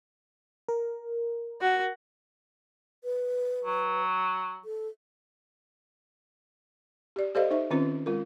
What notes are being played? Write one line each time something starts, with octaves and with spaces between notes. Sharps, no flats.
A#4
F#4
B4
F#3
A4
G4 D5
G4 A4 C5 D5 D#5 F5
D#4 C5 E5
D#3 C4 C#4 F4 B4
G#3 F4 A#4